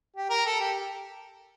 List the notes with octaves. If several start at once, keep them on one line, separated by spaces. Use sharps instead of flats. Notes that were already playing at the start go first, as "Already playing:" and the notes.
G4
A#4
A4
G4